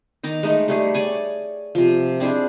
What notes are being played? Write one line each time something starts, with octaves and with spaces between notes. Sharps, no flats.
D#3 D#4 A#5 D6
G#3 A3 D#4
G3 A3 G#4
C#5 D5 G#5
C3 F3
C4 D4 E4 G#4